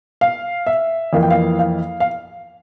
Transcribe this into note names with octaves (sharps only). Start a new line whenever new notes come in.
F5
E5
F2 E3 A#3 F5
G5
F5
F5
F5